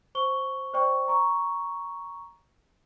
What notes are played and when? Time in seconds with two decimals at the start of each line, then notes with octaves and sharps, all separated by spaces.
0.15 C5 C#6 G7
0.74 C5 D5 G5 C#6
1.08 A#5 C#6